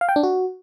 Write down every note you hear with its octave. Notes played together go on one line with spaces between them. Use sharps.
F5
G5
D4
F#4